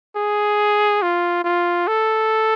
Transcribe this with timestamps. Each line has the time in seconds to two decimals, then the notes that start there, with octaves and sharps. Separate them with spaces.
0.16 G#4
1.02 F4
1.44 F4
1.87 A4